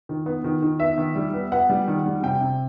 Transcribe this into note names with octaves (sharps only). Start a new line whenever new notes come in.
D#3
B3
D#3
D#3
B3 E5
D#3
G3
B3
B3 F#5
G3
D#3
G3
C3 G5
C3